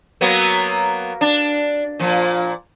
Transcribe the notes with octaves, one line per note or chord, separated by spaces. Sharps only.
F#3 A#3 B3
D4
A#2 F3